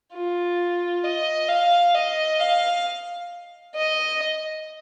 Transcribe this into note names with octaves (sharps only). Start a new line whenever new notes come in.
F4
D#5
F5
D#5
F5
D#5